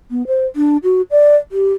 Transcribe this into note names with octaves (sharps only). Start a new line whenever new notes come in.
B3
C5
D4
F#4
D5
G4